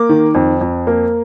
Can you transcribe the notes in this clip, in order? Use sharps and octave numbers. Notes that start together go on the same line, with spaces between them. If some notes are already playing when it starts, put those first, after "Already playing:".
Already playing: A#3 D6
D#3
F2
F2
A#3